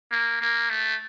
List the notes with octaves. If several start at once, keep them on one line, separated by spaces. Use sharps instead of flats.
A#3
A#3
A3